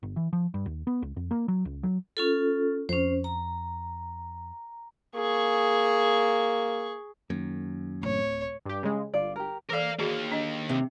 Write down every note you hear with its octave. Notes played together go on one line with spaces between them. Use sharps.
G1
E3
F3
G2
D#2
B3
C#2
F2
A#3
F#3
C#2
F#3
C#4 F4 A4
F2 C#4 C5
A#5
A#3 G#4 C#6
F#2 D#3 A#3
D1 C#5
G2 G4
C#3 G#3
G1 F4 D5
G4 A#4
E3 A4 A#4 D5 F5
D#2 A#3 F#4 G#4
D4 D#5
C3